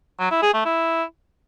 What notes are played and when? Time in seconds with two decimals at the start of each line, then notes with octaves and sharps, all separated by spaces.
0.20 F#3
0.31 E4
0.43 G#4
0.54 A3
0.65 E4